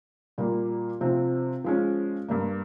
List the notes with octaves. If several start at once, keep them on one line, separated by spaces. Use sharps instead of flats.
A#2 G3 A#3
C3 F3 C4
F3 G#3 C#4
G2 G3 A#3